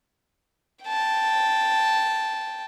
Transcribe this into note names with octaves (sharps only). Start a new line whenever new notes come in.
G5 A5